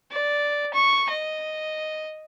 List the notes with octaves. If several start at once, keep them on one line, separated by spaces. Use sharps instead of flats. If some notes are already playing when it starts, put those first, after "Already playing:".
D5
C#6
D#5